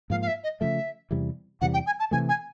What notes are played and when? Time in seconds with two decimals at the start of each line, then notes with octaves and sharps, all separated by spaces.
0.10 G#2 F3 A#3 F5
0.22 F5
0.27 E5
0.44 D#5
0.60 C#3 F3 A3 E5
1.11 E2 C3 E3 G3
1.61 E2 C3 E3 G3 F#5
1.74 G5
1.86 G#5
2.00 A5
2.11 C3 E3 A3 G#5
2.29 G#5